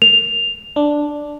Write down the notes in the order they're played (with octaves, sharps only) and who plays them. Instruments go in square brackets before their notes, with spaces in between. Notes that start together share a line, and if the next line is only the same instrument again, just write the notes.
[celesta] F7
[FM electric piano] D4